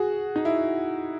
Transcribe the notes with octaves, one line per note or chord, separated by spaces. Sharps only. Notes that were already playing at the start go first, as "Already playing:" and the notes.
Already playing: F#4 G#4
D#4
E4